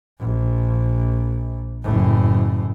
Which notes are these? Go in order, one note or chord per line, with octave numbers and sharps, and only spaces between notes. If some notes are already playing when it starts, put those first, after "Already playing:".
A#1
F#1 A2